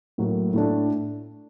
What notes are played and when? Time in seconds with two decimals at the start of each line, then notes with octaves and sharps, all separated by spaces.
0.18 A2 F#3 A#3 F#4
0.54 A2 A3 D4